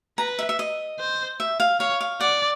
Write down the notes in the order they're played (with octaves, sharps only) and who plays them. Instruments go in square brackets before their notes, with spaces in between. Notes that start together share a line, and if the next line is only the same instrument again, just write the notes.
[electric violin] B4 [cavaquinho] A#5
[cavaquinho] E5
E5
D#5
[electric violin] C5
[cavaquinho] E5
F5
[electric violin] C#5 [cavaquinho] F5
[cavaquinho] F5
[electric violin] D5 [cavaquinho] F#5